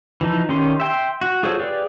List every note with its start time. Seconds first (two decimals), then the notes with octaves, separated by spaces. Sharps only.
0.21 E3 F3 D#4
0.49 D#3 C#4 D#4 G4 C6
0.80 E5 G5 C6
1.21 F#4
1.43 F4 G#4 A4 C5 C#5
1.59 G4 G#4 B4 D5 F5